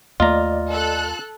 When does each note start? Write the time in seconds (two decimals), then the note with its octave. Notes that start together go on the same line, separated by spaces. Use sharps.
0.20 D#2 A3 F4 D5 D#5 A#5
0.71 A4 F#6